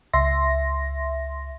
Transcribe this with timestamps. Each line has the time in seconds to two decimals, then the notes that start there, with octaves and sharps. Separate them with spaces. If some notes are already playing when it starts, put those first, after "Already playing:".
0.13 C#2 E5 C6 A#6